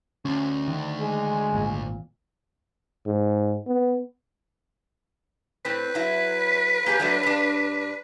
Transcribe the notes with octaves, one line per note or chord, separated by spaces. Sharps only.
D2 C#4
D#3
G#3
G#1 A#2
G#2
B3
A2 C4 B4
F#3 E4
A#3 G4 G#4
F#3 A3 D4
G2 D4